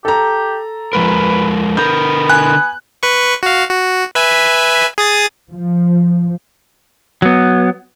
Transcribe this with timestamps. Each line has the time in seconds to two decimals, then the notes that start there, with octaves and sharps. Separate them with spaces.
0.05 G4 A4 A#5
0.93 F3 G#3 A#4 B4
1.77 D3 B3 A#4 G6
2.29 G#5 F#6
3.03 B4 C#6
3.43 F#4 F5
3.69 F#4
4.15 B4 E5 G#5
4.98 G#4 D#6 A6
5.51 F3
7.22 F#3 B3